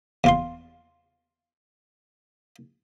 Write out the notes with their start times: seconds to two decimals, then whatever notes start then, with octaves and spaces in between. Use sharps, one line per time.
0.24 E2 F4 C6